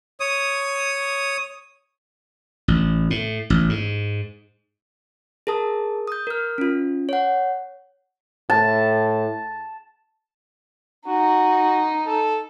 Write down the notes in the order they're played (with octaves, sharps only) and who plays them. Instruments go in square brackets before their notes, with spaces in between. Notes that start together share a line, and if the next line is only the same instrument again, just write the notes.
[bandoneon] C#5 D#6
[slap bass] A1
A2
A1
G#2
[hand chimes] G#4 A#4 A5 D#6
D#6 G6
A#4 F6
C#4 F4
C#5 F#5
[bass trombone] A2 [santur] A5
[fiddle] D#4 [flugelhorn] F#4
[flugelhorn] A4